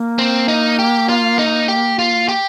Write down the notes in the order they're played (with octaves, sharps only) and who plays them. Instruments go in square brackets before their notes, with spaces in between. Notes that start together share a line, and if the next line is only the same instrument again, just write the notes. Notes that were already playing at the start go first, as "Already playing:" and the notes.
Already playing: [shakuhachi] A#3
[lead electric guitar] C4
D#4
G4
F4
D#4
G4
F4
G4